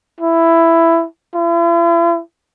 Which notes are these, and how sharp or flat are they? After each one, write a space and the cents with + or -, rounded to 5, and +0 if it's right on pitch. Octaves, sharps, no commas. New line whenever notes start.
E4 +10
E4 +45